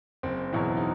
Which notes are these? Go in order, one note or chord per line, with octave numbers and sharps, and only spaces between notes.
F#1 C4
E2 B2 F#3 E4
D#4